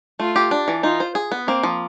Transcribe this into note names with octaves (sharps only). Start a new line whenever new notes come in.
A3 F4
G4
D4
E3
D#4 F4
C5
G#4
B3
A#3 C4
F3